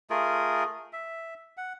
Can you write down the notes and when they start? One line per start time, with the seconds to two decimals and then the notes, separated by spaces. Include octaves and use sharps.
0.10 A3 F4 G#4 A#4
0.93 E5
1.57 F#5